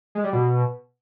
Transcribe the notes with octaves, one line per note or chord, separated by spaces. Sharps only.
G#3
G3
B2